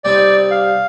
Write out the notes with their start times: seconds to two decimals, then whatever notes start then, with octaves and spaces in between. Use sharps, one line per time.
0.04 C3 G3 C4 D#4 D5
0.51 F5